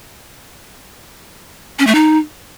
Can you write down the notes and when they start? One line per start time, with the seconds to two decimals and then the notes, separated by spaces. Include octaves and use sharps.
1.79 C#4
1.87 A3
1.95 D#4